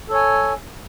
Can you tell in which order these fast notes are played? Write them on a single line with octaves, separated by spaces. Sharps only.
A4 C#5 G#5